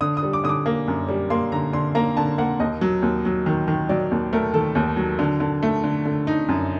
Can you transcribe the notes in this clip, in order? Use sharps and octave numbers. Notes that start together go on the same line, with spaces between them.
D3 D#6
D#6
G3
D6
D3 D#6
D6
A#3
F#2
G3
A#3 C6
D3 A#5
D3 C6
A#3 A#5
D3 A5
A#3 F#5
D#2 D#5
F#3
D#2
F#3
D#3
D#3
F#3 D5
D#2
A3 A#4
D#3 A4
D#2
F#3
D3
D3
A3
D3
D3
D#4
F#2